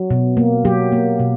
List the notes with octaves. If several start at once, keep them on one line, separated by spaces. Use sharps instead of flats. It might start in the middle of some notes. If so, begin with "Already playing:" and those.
Already playing: F#3
B2
A#3
F#3 G4
A#3
B2